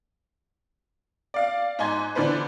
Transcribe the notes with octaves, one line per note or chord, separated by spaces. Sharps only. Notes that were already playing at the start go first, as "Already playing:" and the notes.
D5 F5
G#2 D#4 G#5 C6 G#6
D3 E3 D4 B4 C5